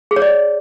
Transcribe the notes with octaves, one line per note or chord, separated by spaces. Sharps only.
G#4
C#5
D5